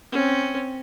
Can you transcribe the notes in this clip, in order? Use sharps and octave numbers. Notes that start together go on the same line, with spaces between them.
C4 C#4